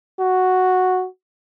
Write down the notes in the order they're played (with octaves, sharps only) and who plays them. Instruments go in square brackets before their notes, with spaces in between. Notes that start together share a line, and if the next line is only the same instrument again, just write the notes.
[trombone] F#4